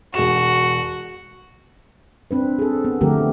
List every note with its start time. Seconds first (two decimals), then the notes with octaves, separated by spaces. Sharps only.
0.14 E1 F#4 G#4 E7
2.31 C4 D4 B4
2.59 G#4 A4
2.85 B3
3.01 D3 F3 A3 G4 A#4